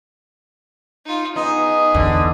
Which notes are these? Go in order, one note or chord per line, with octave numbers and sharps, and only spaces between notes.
D#4 F4
B3 D#4 G#4 D#6
E2 D3